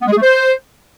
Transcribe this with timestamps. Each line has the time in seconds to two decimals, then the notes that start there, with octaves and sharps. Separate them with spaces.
0.02 B3
0.07 G#3
0.12 G#4
0.17 A3
0.22 C5